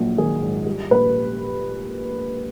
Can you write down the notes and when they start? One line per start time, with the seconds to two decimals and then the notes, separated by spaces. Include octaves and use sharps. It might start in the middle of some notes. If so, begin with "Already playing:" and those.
Already playing: A#1 A#2 F#3
0.17 D#3 G#4
0.42 G#2
0.66 G3
0.91 A#1 B4